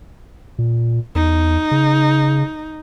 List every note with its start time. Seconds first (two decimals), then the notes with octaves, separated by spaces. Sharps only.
0.59 A#2
1.15 E2 D#4
1.71 C#3